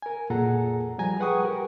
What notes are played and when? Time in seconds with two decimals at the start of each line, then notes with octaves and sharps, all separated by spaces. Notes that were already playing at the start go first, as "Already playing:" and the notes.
0.02 A#4 G#5
0.30 F2 A#2 G#4 A4 F#5 A#5
0.98 F3 G3 G#5 A#5
1.20 G#4 B4 F#5 G5 C#6 D#6
1.44 G4 A#4